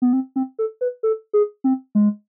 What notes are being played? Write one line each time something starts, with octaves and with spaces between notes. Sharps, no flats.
B3
C4
C4
A4
B4
A4
G#4
C4
G#3